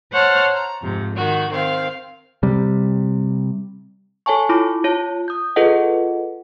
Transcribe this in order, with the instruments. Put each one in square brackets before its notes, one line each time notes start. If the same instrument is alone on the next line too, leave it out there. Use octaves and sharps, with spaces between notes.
[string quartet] C5 C#5 F#5 A5 F6
A#5
F2 G#2 C3
D#3 F#4
D#3 C4 F5
[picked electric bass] C3 G3
[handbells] A4 C#5 G#5 A5 C#6
E4 F4 A5 B5 D6
F4 C#5 A5
D#6 G6
F4 G#4 A4 B4 D#5 F#5